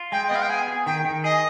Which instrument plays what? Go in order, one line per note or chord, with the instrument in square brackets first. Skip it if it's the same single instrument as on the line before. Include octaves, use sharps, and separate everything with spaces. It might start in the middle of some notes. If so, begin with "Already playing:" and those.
Already playing: [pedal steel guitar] F4
[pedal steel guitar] G#3 [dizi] G5
[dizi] D#5
[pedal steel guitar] B3 [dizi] F5
[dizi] G5
[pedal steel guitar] G#4 [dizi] G#5
[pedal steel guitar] G#4
[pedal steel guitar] D#3 [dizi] G5
[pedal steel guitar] D#3
[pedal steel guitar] G#4 [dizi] D#5